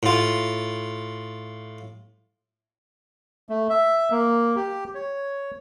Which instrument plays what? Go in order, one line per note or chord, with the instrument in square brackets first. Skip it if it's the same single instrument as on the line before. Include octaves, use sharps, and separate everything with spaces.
[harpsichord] A2 F4
[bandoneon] A3
E5
A#3
G4
C#5